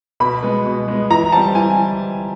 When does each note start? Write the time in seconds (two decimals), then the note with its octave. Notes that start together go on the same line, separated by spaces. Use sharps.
0.20 B2 B5
0.43 G#3 B3
0.66 B2
0.88 G#3 B3
1.10 E3 A#5
1.32 G3 C4 A5
1.55 E3 G#5